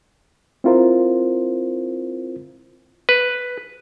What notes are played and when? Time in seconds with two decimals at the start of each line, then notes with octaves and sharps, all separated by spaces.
0.64 C4 E4 F4 A#4 C5
3.09 B4